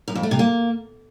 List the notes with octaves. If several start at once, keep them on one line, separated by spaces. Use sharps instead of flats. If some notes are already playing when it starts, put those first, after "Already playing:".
F#2
F2
A3
C3
A#3